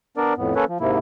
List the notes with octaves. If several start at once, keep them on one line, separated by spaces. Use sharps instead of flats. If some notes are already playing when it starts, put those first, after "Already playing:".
B3 D4 A#4 D5
F2 A2 B3
A#3 C#4 A4 B4 C#5
F3
G#2 C3 A#3 E4